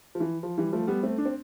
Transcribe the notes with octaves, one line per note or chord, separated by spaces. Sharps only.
F3
E3
F3
E3 G3
F3 A3
G3 B3
A3 C4
D4
C4